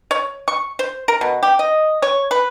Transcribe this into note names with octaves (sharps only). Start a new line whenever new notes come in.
C#5
C#6
C5
A#4
B2
G4
D#5
C#5
B4